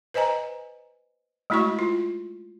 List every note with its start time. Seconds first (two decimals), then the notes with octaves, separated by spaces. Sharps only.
0.14 B4 C5 D#5 G#5 A#5
1.50 G#3 A3 E4 F#4 C#6
1.79 F4